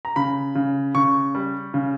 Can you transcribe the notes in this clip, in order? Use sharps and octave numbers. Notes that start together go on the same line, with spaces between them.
A#5
C#3 B5
C#3
C#3 C#6
G3
C#3